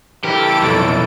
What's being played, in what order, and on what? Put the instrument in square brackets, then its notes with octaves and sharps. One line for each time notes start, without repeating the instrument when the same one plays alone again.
[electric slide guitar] E3 A#4 [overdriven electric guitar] G4 [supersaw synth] A4 D7
[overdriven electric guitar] B1 F2